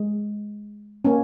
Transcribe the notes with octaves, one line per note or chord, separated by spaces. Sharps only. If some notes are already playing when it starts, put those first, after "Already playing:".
Already playing: G#3
A#3 C#4